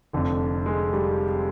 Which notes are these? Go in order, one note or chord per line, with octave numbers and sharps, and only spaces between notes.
F1 F2 D3
G#3
G3